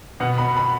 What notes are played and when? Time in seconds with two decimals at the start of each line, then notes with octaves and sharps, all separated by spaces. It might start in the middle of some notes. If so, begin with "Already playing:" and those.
0.20 B2 B3 F#5
0.38 B5
0.57 B5